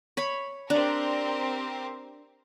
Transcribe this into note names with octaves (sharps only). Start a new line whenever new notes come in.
C#5 B5
C4 D4 G4 A#4